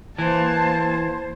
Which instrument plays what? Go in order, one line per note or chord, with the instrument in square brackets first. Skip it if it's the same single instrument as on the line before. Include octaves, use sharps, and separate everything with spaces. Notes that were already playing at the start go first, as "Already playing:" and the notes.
[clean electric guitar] E3 [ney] A#3 [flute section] C5 [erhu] A5